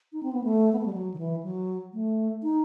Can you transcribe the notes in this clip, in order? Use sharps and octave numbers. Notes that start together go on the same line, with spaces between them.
D#4
C4
B3
A3
B3
A3
G3
F#3
D#3
E3
F#3
A3
D#4